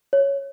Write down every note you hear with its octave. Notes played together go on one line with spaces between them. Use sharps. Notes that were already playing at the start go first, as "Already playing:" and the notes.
C#5